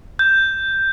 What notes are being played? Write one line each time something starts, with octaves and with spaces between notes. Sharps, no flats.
G6